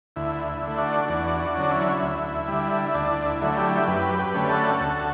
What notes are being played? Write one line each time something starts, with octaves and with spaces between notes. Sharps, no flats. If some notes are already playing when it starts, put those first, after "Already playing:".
D2 E4
E4
D3 A3
D4 F#4
E2 D4 F#4
D4 F#4
D3 F#3 C#4
E4
D2
D3 G3
D2 D4
E4
D3 F#3 A3
E4 G4
F#2 G4 B4
G4 B4
D3 A3 C#4
F#4 A4
D2